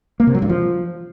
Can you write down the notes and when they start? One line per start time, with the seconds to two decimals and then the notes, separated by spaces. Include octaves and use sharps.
0.20 A#3
0.27 C3
0.35 F#3
0.42 G2
0.49 F3